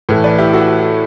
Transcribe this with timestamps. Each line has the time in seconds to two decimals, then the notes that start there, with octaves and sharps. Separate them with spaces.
0.09 A2 E3 A3
0.24 B4 D5
0.38 E4 G4
0.53 F#4 A4